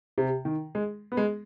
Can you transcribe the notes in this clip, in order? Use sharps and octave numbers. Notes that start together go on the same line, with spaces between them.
C3
D#3
G#3
B3
G#3